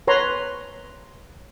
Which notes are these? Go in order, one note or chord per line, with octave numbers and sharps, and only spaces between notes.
B4 C#5 A#5 C6